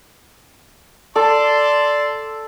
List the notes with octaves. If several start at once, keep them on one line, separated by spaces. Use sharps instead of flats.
A4 D5 A5 C6